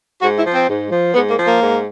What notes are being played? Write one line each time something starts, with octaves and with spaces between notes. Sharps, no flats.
G#2 F#4
E4
F3
C4
G#2
F3
G#2 B3
A#3
F3
A#3
G#2